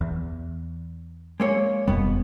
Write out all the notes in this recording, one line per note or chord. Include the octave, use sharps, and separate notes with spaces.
E2
G#3 A#3 C#5
E1 F2 B2 G3 B3